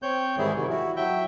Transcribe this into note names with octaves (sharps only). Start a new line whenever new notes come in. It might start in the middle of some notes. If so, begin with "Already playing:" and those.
C4 C#5 G6
G#2 D#3 E3 G3 E4 G#4
C3 D#3 F#3
E4 F#4
F#3 E5 G5